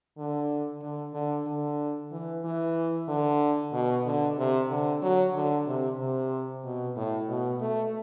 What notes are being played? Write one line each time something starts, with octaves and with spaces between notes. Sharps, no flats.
D3
D3
D3
D3
E3
E3
D3
B2
D3
C3
D3
F#3
D3
C3
C3
B2
A2
B2
A3